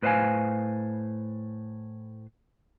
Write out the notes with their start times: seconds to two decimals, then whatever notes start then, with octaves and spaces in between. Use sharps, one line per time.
0.02 A2 B4 C5 D#5 F5 G#5